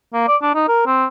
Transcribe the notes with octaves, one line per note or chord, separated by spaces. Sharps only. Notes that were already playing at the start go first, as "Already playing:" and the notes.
A#3
D5
D4
D#4
A#4
C4